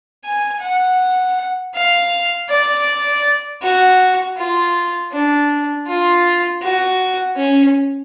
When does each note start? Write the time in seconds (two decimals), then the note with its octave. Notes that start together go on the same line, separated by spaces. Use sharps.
0.25 G#5
0.61 F#5
1.74 F5
2.50 D5
3.63 F#4
4.37 F4
5.12 D4
5.88 F4
6.62 F#4
7.36 C#4